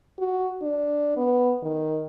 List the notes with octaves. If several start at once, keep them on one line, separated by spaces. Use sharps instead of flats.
F#4
D4
B3
D#3